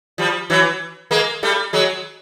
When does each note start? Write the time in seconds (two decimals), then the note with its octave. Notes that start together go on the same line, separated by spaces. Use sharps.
0.18 F3 G3
0.50 E3 F#3
1.11 G#3 A#3
1.43 G3 A3
1.73 F#3 G#3